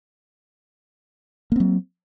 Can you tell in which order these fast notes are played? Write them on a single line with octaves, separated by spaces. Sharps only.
A#3 C4 F#3